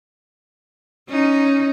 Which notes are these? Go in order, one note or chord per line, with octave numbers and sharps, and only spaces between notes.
C#4 D#4